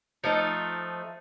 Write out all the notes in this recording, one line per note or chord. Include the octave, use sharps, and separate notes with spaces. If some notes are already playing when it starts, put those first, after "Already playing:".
F3 A3 D#4